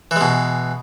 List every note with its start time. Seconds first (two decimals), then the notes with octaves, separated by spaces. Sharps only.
0.11 E3
0.16 G#3
0.21 B2